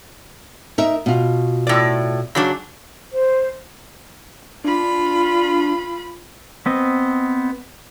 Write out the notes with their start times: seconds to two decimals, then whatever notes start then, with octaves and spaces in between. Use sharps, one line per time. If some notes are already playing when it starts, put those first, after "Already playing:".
0.78 D#4 A#4 E5
1.06 B2 F4
1.67 A2 D5
2.35 C#3 F#3 D4
3.12 C5
4.64 D4 F4 B5
6.66 B3 C4 D#5